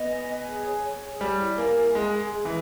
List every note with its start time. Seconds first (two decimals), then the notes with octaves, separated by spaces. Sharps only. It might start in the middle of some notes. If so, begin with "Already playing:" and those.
Already playing: B3 D#5
0.09 G#5
0.27 G#5
0.46 G#4
0.65 C#5
0.84 C#5
1.02 G#4
1.21 G3 C#5
1.39 E4
1.57 A#3 G#5
1.77 E4
1.95 G#3 G#4
2.13 G#4
2.32 G#4
2.45 E3